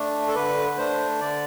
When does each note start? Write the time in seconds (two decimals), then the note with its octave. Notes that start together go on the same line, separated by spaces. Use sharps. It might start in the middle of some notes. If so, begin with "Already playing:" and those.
Already playing: A3 D4
0.28 A4
0.35 D3 B4
0.77 A3 D4 C5
1.20 D3 D5